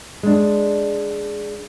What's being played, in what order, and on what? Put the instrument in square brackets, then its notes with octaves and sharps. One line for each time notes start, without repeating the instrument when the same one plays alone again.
[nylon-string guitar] G#3 D4